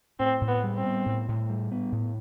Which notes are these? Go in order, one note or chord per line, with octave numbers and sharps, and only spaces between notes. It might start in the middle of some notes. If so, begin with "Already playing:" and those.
A2 C4
A2
B3
G3
C4
B3
A2
A2
G3
B3
A2